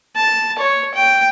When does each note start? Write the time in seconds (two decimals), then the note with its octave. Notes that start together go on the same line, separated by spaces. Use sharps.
0.16 A5
0.59 C#5
0.94 G5